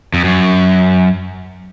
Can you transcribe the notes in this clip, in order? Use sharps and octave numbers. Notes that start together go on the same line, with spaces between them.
F2
F#2